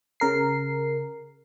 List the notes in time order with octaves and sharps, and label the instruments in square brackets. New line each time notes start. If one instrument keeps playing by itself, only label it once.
[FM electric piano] C#3 A#4 C7